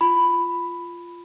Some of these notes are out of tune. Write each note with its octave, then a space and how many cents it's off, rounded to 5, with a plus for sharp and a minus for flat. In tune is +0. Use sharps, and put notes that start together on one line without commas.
F4 -10 B5 +5